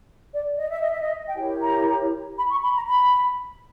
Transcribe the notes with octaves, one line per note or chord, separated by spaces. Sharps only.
D5
D#5
E5
D#5
E5
D#5
G5
E4 G4 A#4 C#5 G#5
A#5
B5
C#6
B5
A#5
B5